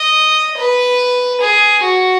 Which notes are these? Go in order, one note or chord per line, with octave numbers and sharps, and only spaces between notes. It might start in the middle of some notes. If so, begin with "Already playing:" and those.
Already playing: D#5
B4
G#4
F#4